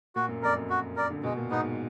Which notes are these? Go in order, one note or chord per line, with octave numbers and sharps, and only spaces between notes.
A#2 F#4
F#2
F2 A#4 D5
F#2
F#4
A#4 D5
D3
B2 G#3
A#2
G#2 B3 D#4